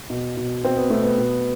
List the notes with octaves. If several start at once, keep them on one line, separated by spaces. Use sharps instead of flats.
B2
B2
B2 C4
B3
B2 A3
B3
B2